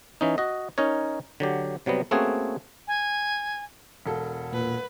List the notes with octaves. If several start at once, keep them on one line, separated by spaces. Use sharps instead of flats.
E3 C#4 D#4
F#4 D#5
C#4 D#4 A#4 C#5
D3 F#3 G4
C3 F#3 G3 B3
A3 A#3 C4 C#4 F#4 G#4
G#5
E1 A4
A#2 B4